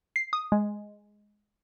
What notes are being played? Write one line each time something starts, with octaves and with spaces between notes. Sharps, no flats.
C7
D#6
G#3